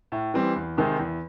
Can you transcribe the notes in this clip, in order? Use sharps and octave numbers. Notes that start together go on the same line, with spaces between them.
A2
E3 G3 C4
E2
C3 D#3 G#3 C4
E2